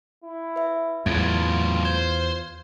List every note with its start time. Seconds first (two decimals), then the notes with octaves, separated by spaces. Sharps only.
0.24 E4
0.56 B4 E5
1.06 E2 A2 F#3 F4 G#6 A6
1.85 C5 G#6